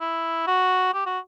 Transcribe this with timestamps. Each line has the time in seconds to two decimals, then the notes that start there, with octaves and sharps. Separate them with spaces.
0.01 E4
0.47 F#4
0.94 G4
1.06 F#4